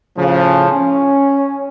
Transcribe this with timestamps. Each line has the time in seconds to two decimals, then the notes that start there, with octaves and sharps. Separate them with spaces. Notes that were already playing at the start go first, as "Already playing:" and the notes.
0.17 A2 C#3 F3
0.72 C#4